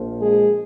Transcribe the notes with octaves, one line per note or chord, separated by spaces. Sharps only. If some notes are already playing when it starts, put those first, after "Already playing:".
Already playing: A#1 A#2 F3
G#3 G#4